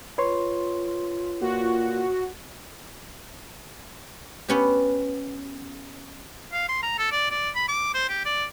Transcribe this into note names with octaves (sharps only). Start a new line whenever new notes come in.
F4 B4 C#5 C6
A#2 F#4
B3 C#4 G4
F5
C6
A#5
A4
D5
D5
B5
D6
C5
G4
D5